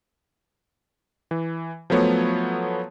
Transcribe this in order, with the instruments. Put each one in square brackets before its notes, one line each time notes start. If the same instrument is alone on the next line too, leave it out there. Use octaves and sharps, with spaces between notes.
[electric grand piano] E3
F3 F#3 A3 B3 C#5